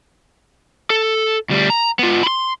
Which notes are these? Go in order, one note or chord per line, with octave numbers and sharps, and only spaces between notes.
A4
D2 G3
A#5
B3 F4
B5 C6